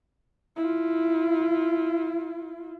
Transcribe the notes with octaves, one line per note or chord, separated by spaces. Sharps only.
E4 F4